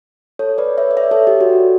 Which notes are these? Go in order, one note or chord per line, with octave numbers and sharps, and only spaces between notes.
A4 C#5
B4 D5
C#5 E5
D5
C#5 E5
A4 C#5
G4
F#4